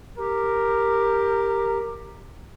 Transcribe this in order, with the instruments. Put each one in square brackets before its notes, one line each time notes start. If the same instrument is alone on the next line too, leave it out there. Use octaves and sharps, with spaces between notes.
[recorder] G4 [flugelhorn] A#4